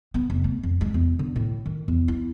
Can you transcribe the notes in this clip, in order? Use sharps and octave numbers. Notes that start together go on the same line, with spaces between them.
B3
F1
A3
F2
G#3
E2
D3
A2
D#3
E2
E4